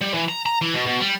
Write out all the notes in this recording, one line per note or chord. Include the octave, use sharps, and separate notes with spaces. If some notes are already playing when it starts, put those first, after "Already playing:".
G3
E3
A#5
A#5
E3
B2
B2
G3